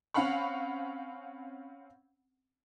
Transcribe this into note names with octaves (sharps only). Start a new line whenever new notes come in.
C4 C#4 F5 F#5 B5 C#6